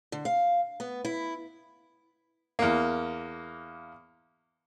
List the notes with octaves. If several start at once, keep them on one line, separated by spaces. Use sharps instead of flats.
D3
F5
B3
E4
E2 A#3